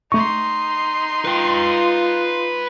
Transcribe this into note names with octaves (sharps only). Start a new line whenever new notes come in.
A3 D#4 C6 C#6
F4 B4 G5